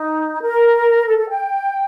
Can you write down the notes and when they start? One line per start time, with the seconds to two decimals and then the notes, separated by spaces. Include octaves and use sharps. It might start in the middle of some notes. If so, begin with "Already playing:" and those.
Already playing: D#4
0.41 A#4
1.07 A4
1.18 A4
1.29 G5